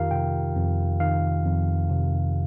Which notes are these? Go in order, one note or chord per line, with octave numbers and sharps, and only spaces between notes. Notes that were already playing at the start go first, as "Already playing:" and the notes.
Already playing: F2 D#3 F4 G4 A#4 F5
C3 G5
F2
D#3 F5
F2
C3